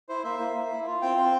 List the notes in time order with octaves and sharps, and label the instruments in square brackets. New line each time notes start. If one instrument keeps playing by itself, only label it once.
[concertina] E4 C5
A#3 E5
A#3
A#3
E4
F4
C4 G5
C4